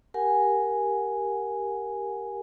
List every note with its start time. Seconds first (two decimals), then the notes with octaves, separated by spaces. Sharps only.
0.14 G4 A#4 F#5 G#5